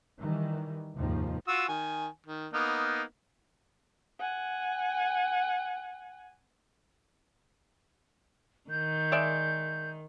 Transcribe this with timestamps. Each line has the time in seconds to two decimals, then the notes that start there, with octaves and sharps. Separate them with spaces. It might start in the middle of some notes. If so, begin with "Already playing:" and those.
0.20 D#3 E3 G3
0.96 F1 D#2 G#2 D#3 F3
1.48 F4 F#4 E6
1.69 D#3 G#5
2.26 D#3
2.53 A#3 B3 D#4
4.20 F#5 G#5
8.70 D#3 G6
9.12 G#3 D5 E5